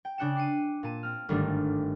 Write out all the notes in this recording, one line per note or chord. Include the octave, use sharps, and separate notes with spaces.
G5
C#3 D4 G5 F#6 C#7 E7
D6 C7 C#7 D#7
A#2 A5 D#7
C4 F6
G1 G#2 D#3 G3 A3 D4